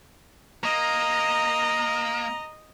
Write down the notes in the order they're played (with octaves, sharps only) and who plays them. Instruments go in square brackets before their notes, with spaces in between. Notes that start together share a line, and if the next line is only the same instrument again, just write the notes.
[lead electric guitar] A#3 [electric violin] D#5 [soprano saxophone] A#5